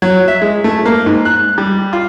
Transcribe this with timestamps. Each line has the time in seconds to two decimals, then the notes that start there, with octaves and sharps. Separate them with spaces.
0.02 F#3
0.28 E5
0.42 G#3
0.64 A3
0.86 A#3
1.06 G#2
1.25 F#6
1.58 G3
1.93 F4